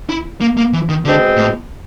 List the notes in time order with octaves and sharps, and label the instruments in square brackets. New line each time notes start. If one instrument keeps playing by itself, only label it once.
[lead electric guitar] E4
A#3
A#3
E3
D#3
[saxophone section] B2 G#3 C4 [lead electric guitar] D3
[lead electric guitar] A2